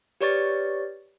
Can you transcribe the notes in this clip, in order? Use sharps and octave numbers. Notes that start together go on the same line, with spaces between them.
G4 B4 C#5 D5 C#6 A6